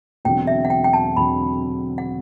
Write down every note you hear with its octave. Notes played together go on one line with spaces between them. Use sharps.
E1 E2 D3 F#3 C4 G5
E5
F#5
G5
G5
A5
E1 E2 D3 F#3 C4 B5
F#5